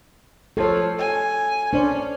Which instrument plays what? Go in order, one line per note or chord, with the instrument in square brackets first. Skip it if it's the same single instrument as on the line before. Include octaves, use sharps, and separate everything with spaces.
[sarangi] F3 [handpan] A4 C#5
[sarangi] G#5
[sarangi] C#4 [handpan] D4 C5 D5